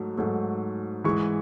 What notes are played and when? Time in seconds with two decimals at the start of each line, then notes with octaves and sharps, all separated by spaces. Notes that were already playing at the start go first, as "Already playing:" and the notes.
Already playing: G#2 F#3 A3
0.18 G#2 F#3 A3
1.04 G#2 E3 G#3 C#6